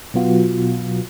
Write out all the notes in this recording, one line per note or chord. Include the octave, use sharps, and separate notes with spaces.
B2 F#3 B3 F4 F#4